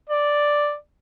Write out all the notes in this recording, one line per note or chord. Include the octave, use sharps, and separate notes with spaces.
D5